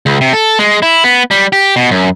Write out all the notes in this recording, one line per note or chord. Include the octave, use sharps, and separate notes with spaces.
C#2
C3
A4
G#3
E4
B3
G3
G4
B2
F#2